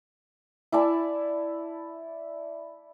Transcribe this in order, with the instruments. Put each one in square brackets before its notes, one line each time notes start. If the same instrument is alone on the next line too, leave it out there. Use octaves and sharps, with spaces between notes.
[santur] E4 D5 A5